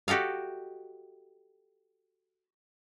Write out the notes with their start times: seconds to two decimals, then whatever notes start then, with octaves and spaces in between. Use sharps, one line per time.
0.08 F#4 G4 A4 D#5 F5